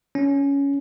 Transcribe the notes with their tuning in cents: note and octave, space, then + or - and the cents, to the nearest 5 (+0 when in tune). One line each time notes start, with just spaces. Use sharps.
C#4 +10